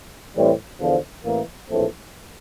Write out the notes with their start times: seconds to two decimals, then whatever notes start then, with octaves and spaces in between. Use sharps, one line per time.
0.35 A2 E3 G3 C4
0.79 E2 D3 F3
1.23 A1 A2 E3 A#3
1.69 A#1 A2 E3 A3 C4